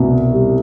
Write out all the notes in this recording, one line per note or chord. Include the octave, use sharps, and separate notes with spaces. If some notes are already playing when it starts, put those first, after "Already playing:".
Already playing: C2 B2
G3